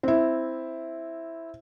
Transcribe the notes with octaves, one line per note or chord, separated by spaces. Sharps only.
C4 E4